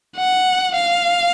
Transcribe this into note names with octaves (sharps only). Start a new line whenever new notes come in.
F#5
F5